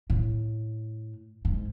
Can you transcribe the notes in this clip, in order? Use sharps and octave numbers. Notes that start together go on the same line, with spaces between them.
A2
G#2